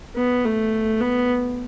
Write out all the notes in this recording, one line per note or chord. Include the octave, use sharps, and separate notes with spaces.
B3
A3
B3